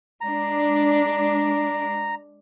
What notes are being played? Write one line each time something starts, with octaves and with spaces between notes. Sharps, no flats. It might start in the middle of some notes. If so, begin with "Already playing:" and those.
G#3 D4 A#5